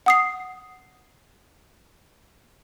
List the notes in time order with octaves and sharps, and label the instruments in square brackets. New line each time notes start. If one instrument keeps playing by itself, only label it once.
[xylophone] F#5 D#6 C7